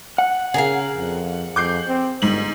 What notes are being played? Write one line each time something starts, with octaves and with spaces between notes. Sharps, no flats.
F#5
C#3 G#4 A#4 F5
F2
F2 D6 G6 C7
C4
G1 G#2 F#7